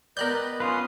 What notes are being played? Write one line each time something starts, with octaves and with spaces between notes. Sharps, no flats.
B3 G4 A#4 B4 D5 D#5 F#6 G6
C#4 F4 B4 F5 C6 D#6